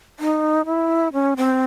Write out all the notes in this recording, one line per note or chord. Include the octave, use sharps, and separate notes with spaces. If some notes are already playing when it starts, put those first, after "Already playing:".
D#4
E4
C#4
C4